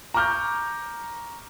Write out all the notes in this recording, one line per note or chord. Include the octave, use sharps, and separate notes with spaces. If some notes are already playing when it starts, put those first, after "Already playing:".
A#5 C#6 D6 F6 G6